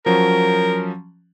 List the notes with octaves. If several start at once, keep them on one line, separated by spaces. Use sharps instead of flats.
F3 F#3 C#4 A#4